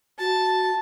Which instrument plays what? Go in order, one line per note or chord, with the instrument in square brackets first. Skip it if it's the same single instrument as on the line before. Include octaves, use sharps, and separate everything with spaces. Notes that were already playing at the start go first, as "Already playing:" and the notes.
[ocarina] F#4 [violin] A5